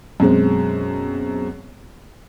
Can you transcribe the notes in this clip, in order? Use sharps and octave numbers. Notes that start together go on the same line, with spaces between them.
F#2 B2 G#3 C4